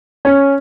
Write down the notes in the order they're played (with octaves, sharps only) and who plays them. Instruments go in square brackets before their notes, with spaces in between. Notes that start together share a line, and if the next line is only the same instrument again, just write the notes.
[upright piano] C#4